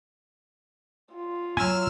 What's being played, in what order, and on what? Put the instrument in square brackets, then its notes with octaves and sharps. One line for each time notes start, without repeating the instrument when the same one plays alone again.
[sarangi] F4
[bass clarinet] F#3 [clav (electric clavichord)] G#5 [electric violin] E6 F6